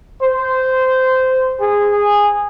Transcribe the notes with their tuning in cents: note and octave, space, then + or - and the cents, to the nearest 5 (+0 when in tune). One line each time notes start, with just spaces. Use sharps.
C5 -15
G#4 -15